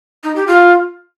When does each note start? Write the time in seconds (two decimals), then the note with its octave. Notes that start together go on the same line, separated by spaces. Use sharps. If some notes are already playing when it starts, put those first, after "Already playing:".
0.24 D#4
0.36 G4
0.47 F4